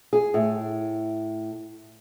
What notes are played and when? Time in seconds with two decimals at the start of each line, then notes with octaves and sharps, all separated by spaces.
0.13 G#4
0.34 A2